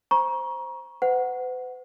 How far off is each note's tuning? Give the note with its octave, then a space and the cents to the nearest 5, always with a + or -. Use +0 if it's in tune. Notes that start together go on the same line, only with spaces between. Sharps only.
C5 +5 A#5 +30 C#6 +0
B4 +45 F#5 +0